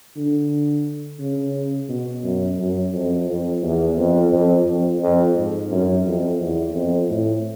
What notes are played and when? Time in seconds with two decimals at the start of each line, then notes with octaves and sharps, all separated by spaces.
0.16 D3
1.19 C#3
1.89 B2
2.23 F#2
2.58 F#2
2.93 F2
3.28 F2
3.62 E2
3.97 F2
4.32 F2
4.66 F2
5.01 F2
5.36 G#2
5.71 F#2
6.05 F2
6.40 E2
6.74 F2
7.09 A2